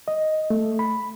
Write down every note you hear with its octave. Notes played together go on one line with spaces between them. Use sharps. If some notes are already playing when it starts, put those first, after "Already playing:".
D#5
A3
B5